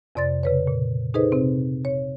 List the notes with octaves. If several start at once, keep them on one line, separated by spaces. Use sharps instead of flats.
F2 C3 D5 C6 A6
C#3 B4 C#5
A#2
D#4 G#4 A4 B4 C5 D#5
C3 C4
C#5